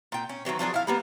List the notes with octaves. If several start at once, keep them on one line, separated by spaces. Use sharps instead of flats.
A#2 G5
C#4
D#3 E3 F#3 C4
F3 F#3 D4 G#4
E4 F5
G3 A#3 B3